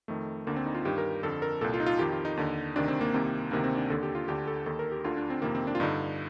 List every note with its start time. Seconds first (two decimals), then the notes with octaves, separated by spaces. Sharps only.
0.08 F2 D#3 A3
0.47 D2 D3 A#3
0.56 C4
0.66 D#4
0.75 F4
0.85 G2 D#3 G4
0.98 A#4
1.23 F2 D3 A4
1.42 A#4
1.61 C2 A#2 A4
1.74 F4
1.80 D#4
1.86 F4
1.99 F2 D#3 G4
2.12 F4
2.25 D#4
2.37 D#2 D3
2.76 D2 C3 D#3 D4
2.88 C4
3.01 A#3
3.14 C2 C3 D#3
3.51 D2 C3 D#3 A#3
3.64 C4
3.77 D4
3.90 D#2 D3 A4
4.03 G4
4.15 F4
4.28 D2 D3 G4
4.47 A4
4.66 D#2 D#3 A4
4.79 A#4
4.92 G4
5.04 D2 D3 F4
5.17 D4
5.30 C4
5.42 F2 C3 D#3 A#3
5.55 C4
5.67 D4
5.75 F4
5.80 G2 D3 D#4